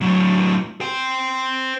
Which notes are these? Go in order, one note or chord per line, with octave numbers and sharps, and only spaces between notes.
A2 F#3
C5 G5